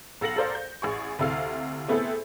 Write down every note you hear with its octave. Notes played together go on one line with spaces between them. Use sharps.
B1 A4 F5 A#6 C#7 F#7
A4 A#4 C5 D5 F5
G6
A1 G#4 C#6
D2 C3 E4 A4 F5
A3 B3 C4 E4 G#4 A4